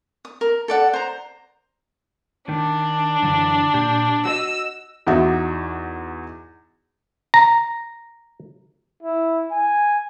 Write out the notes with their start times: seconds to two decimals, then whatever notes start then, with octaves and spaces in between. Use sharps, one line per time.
0.25 D#6
0.41 A#4
0.68 A4 D5 F#5
0.93 C5 A#5
2.49 D#3 D4
3.22 F#2 D3 E3
3.74 A#2 G4
4.25 F#4 C5 D#5 E6
5.07 E2 D#4 F#4 E5
7.34 A#5
9.03 E4
9.52 G#5